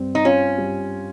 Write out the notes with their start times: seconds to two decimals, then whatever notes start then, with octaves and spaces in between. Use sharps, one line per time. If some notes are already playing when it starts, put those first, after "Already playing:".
Already playing: G2 C4
0.15 D#4
0.25 C#4 F4
0.58 G3